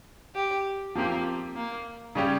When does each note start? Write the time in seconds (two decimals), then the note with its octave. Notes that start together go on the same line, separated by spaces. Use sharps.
0.35 G4
0.95 F3 A#3 C4 G4
1.55 A#3
2.15 C#3 G3 C#4 G4